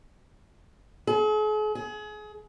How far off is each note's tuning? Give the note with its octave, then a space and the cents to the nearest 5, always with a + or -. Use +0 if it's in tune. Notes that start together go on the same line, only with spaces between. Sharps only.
G#4 +45
G#4 +30